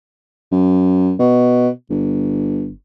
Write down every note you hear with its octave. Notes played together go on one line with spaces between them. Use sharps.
F#2
B2
G1